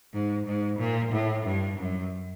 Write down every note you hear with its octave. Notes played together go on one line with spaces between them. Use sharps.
G#2
G#2
A#2
A2
G2
F#2